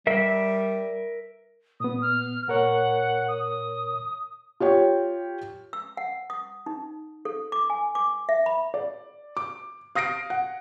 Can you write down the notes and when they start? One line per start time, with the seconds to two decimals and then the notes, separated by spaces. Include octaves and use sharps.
0.07 G3 A#4 E5
1.80 A#2 B3 D#6
2.02 F6
2.48 A#2 A#4 C#5 F#5
3.28 D#6
4.60 F4 G4 C#5 G5
5.73 E6
5.97 F#5
6.30 D#6
6.66 D#4
7.25 A4
7.52 D6
7.70 G#5
7.95 D6
8.29 E5
8.46 B5
8.74 D5
9.37 D6
9.95 F5 D#6 A#6 C7 D7
10.30 F#5